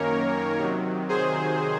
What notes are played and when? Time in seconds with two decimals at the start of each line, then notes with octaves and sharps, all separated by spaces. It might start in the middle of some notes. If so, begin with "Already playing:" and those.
Already playing: F#2 D#3 A#3 C#4 A#4 C#5
0.58 C3 D#3 F#3
1.09 G#4 C5